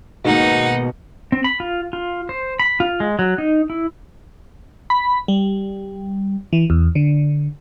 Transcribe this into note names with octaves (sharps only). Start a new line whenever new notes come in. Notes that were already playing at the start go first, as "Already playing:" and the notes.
G#2 B2 D#3 A#3 D#4 F#5
C4
B5
F4
F4
C5
B5
F4
G#3
F#3
D#4
E4
B5
G3
E3
E2
D3